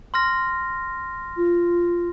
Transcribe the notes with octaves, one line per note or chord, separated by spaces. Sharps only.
C6 F6 A#6
F4